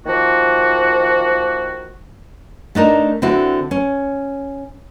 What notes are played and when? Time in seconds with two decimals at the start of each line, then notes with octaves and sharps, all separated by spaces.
0.07 D#3 F3 A#3 F#4
2.75 A3 D4 D#4 A#4
3.22 D3 C4 E4 F#4
3.71 C#4